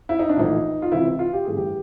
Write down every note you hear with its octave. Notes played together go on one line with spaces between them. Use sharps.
E4
D#4
D4
A#1 A2 E3 D#4
F4
C#2 C3 E3 E4
F4
G4
A1 G2 D3 G#4
G4